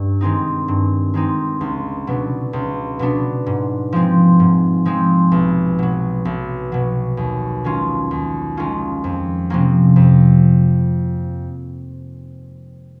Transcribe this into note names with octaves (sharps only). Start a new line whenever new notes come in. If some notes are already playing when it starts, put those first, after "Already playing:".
Already playing: G2
D#3 G#3 C4 D#4
G2
D#3 G#3 C4 D#4
C#2
B2 F#3 B3 D4
C#2
B2 F#3 B3 D4
G#2
F3 G#3 C4
G#2
F3 G#3 C4
B1
B2 F#3
B1
B2 F#3
D#2
D#3 G#3 C#4 F4
D#2
D#3 G#3 C#4 F4
F2
C3 F3 A#3 C#4
F2